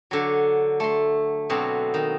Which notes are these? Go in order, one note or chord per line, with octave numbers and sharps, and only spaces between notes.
D3 F#3
A3 C6
B2 D3 F#3 C4
D#3